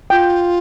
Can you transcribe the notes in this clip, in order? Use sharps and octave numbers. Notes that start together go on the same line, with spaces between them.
F4 G5